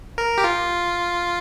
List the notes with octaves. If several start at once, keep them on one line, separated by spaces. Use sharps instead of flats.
A#4
G4
F4